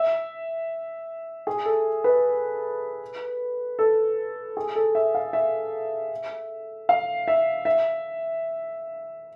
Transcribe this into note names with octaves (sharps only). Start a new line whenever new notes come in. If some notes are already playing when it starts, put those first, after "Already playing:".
Already playing: E5
G#4
A4
B4
A4
G#4
A4
E5
F5
E5
F5
E5
E5